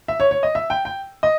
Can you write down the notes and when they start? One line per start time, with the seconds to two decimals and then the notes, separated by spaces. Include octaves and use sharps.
0.08 E5
0.20 C#5
0.31 C#5
0.43 D#5
0.55 E5
0.70 G5
0.85 G5
1.23 D#5